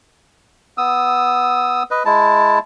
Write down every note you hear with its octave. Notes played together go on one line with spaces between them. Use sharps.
B3 D#6 E6
B4 D#5
G#3 E4 A5